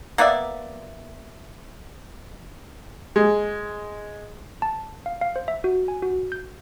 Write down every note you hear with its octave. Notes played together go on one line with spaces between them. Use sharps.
A#3 B3 D5 E5
G#3
A5
F5
F5
C5
E5
F#4
G#5
F#4
G6